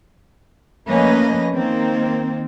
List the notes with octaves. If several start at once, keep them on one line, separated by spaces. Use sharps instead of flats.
F3 A3 A#3 C#4 B4 D#5
D#3 A#3 C4